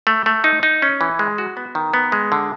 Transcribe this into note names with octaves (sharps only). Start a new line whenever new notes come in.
A3
A3
D#4
D#4
C#4
E3
G#3
F#4
B3
D#3
B3
G#3
D3